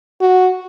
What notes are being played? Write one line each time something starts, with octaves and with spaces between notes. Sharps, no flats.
F#4